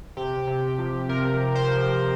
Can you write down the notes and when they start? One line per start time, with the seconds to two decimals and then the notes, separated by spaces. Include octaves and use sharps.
0.17 C3 G4
0.48 C3
0.78 F3
1.09 C3 A#4
1.40 C3
1.55 C5
1.71 F3